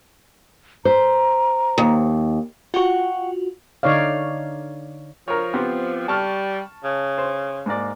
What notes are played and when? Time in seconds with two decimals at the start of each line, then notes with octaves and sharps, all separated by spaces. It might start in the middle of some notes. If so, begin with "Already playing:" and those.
0.85 C5 A#5
1.78 D#2
2.74 F4 F#4 F#5 G5 C#6
3.83 D3 D#4 C#5 D5 F5
5.28 F3 A#4 C#5
5.54 B3 C4 G4
6.08 G3 A5 C#6 F6
6.84 C#3
7.18 C5
7.66 G#2 A#3 D5